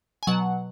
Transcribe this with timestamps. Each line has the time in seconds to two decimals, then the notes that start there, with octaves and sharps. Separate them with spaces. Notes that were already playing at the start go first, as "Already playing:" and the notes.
0.23 G#5
0.27 B2 F#3 F#5